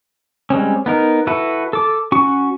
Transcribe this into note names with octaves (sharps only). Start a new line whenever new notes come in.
G3 G#3 C4 C#4
B3 D#4 A#4
E4 F#4 A4 B4
A4 D6
C#4 F#4 C#6